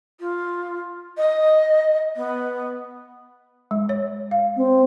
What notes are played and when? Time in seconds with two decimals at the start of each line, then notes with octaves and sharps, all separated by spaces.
0.20 F4
1.17 D#5
2.16 B3
3.71 G#3
3.89 C#5
4.31 F5
4.56 C4